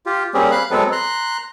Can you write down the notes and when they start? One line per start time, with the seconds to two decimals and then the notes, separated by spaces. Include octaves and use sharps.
0.06 F4 G4
0.34 G3 A#3 C4 C#4 G4 G#4
0.51 F5 B5 F#6
0.71 F#3 G#3 B3 C4 A4 B4
0.92 A#5 C6 F#6